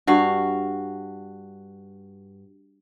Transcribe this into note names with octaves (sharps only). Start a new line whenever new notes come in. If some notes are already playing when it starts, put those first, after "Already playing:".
G2 F#4 F5